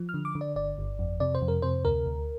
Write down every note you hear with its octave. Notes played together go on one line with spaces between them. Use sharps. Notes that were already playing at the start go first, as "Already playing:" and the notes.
Already playing: F3
F6
D3
D6
D3
D5
G1 D5
G1
F2
C3 D5
C5
F2
A#4
C3 C5
D2 A#4
D2